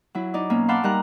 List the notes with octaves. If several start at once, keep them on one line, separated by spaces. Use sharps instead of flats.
F#3 E4
D#4 D5
B2 A#3 C#4
F5 F#5 A5 B5 C6 D6
G3 D#4 A#4 A#5 F#6